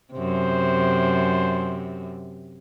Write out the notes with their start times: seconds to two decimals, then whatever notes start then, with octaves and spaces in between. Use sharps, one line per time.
0.14 F#2 C3 C5